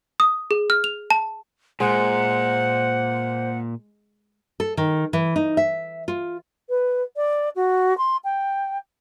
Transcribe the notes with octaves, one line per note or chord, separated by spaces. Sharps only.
D#6
G#4
F6
F7
A5
A#2 G#3 C5 F#5
A4
D#3
E3
D#4
E5
F4
B4
D5
F#4
C6
G5